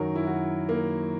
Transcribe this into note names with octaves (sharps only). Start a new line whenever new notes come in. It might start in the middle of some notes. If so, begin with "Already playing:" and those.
Already playing: F#2 D#3 F#3 A#4
E4
F#4
A#3